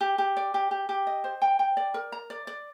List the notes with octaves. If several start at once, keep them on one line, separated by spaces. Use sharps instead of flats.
G4
G4
D5
G4
G4
G4
D#5
C5
G5
G5
D5
A#4
A#5
D5
D5